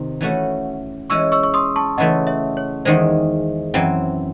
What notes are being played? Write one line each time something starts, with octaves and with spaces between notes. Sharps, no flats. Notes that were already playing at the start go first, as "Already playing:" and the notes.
Already playing: C3 D#3 C4
E3 A3 C#4 F#4
E3 G#3 C#4 C#6 E6
C#6 E6
C#6
C6 D#6
A5 C#6
C#3 E3 A3 D#5 F#5
C#5 E5
C#5
E2 D#3 G#3 C5
F#2 E3 C4